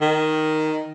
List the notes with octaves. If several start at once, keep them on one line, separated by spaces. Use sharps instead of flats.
D#3